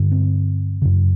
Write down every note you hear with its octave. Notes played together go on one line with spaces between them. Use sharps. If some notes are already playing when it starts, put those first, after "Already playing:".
Already playing: G2 D3
C4
F#2 C#3